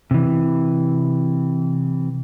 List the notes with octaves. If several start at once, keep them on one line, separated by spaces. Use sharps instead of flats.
C3 E3